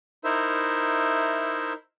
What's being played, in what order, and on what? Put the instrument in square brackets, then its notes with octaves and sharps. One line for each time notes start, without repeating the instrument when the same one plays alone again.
[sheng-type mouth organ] D#4 E4 A#4 C5 E5